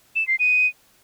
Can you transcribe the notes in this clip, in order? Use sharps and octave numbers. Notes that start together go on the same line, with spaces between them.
E7
C7
D#7